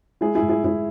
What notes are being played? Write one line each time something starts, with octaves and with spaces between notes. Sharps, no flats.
G#3 E4 G#4
E4 G#4
G#2
E4 G#4
G#2 E4 G#4